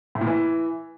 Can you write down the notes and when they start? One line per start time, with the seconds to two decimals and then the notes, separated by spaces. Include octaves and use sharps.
0.15 A2
0.21 A#2
0.27 E3